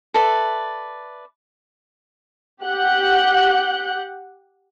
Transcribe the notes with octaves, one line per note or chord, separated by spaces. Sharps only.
A4 B4 D5 E5
G4 F#5 F#6 G6